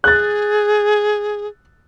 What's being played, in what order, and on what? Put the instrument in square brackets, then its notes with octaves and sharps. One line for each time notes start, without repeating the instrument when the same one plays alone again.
[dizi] G#4 [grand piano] F#6 A6